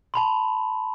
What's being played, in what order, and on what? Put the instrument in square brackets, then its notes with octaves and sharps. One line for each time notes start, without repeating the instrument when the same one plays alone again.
[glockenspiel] A5 B5 C6